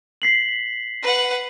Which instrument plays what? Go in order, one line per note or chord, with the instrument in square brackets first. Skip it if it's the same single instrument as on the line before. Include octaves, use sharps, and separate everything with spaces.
[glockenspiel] B6 C7 F#7
[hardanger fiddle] B4 F#5